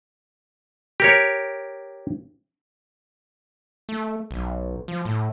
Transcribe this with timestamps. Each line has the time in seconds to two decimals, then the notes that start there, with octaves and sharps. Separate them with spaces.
1.00 G4 A#4 C#5
3.89 A3
4.31 B1
4.88 F3
5.05 A2